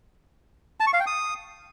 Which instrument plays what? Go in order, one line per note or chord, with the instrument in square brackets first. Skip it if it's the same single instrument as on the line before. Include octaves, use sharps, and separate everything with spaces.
[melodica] A5
C#6
F5
G5
D#6